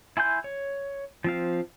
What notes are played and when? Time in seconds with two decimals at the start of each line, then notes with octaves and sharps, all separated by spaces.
0.17 E4 G#5 C6 G6
0.44 C#5
1.24 F3 C4 F5